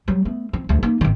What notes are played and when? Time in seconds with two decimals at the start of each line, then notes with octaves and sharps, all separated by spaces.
0.08 F#3 G3
0.25 A3 B3
0.53 F3 C4
0.69 D2 A3
0.83 A#3 D#4
1.01 G#1 D#3